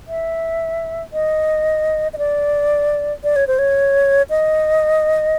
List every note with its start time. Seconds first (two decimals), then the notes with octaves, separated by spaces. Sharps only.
0.08 E5
1.13 D#5
2.13 D#5
2.18 D5
3.24 D5
3.36 C#5
3.47 C5
3.59 C#5
4.30 D#5